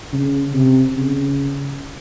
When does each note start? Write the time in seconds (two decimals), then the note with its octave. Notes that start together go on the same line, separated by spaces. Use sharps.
0.13 C#3
0.54 C3
0.95 C#3